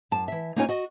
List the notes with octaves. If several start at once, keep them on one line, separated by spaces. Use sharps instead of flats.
F#2 A5
E3 E5
A#3 C#4 D#4 F4 C#5 G#5
F#4 D#5